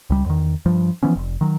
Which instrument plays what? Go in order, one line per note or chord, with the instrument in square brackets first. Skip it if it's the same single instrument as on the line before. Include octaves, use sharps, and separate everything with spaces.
[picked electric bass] C#2 G3
E2 D#3
G2 F3
E3 F3 B3 C#4
F1
D#3 F#3